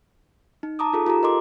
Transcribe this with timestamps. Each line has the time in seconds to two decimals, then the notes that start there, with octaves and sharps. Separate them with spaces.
0.63 D#4
0.79 A5 A#5 D6 D#6
0.93 D#4 F4 G#4 A4
1.07 F4 G4 A4 A#5
1.23 A#4 D#5 C6 D6